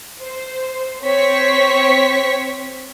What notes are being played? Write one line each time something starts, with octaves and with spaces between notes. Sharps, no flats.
C5
C4 C5 C#5 C#6 B6